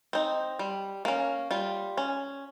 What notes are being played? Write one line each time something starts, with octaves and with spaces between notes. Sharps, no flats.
C4 D#4
G3
A#3 C#4
G3 F4
C#4